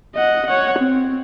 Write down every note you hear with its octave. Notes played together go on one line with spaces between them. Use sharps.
D#5 F#5
C#5 F#5
C4